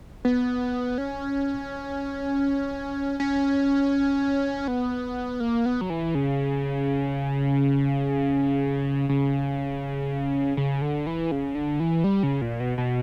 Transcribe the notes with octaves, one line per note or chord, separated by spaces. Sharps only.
B3
C#4
C#4
B3
A#3
B3
F#3
E3
C#3
C#3
C#3
D3
E3
C#3
D3
E3
G3
C#3
A#2
B2
B2